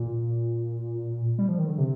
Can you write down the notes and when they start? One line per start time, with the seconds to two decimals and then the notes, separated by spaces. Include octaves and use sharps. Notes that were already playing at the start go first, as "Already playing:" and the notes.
Already playing: A#2
1.38 G3
1.49 F3
1.58 D#3
1.68 D3
1.78 C3